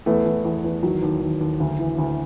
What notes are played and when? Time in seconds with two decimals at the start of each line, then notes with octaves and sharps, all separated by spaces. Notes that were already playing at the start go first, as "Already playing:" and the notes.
0.06 E2 A3 B3
0.25 E2
0.45 E2
0.64 E2
0.83 D#3 F#3
1.02 D#2
1.21 D#2
1.41 D#2
1.60 D2
1.79 E3
1.98 D2